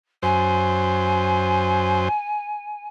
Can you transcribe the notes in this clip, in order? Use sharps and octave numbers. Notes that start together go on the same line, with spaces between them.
F#2 C5 G#5